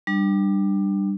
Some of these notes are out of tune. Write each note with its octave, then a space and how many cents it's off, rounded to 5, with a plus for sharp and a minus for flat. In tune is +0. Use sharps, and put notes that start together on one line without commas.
G3 +0 D4 +25